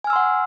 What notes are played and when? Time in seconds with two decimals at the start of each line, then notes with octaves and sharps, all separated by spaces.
0.04 G#5
0.07 F6
0.10 E6
0.13 C6
0.16 F#5